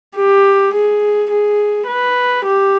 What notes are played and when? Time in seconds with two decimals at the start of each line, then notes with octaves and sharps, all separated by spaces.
0.16 G4
0.74 G#4
1.31 G#4
1.87 B4
2.45 G4